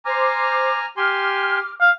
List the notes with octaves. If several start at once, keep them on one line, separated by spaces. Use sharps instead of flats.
C5 G#5 A#5 D6 F6
G4 G#5 C6 D6 F6
F5